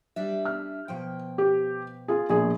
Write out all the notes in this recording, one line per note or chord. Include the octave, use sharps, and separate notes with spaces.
G3 D4 E5
F6
B2 F3 G5
G4
F4 G#4
A#1 B2 G#4